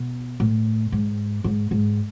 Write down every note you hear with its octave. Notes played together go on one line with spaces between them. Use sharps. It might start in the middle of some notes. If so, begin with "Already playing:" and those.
Already playing: B2
A2
G#2
G#2
G#2